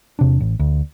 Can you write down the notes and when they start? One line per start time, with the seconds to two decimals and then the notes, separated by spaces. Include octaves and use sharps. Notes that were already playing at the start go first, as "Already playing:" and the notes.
0.19 E2 C3 D4
0.40 A1
0.59 D2